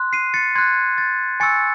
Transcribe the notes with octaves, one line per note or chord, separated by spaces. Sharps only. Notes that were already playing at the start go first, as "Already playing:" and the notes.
Already playing: C6 F#6
C7 D#7
A6 C#7
C6 F#6 G#6
A6
G#5 C#6 E6 A6 C#7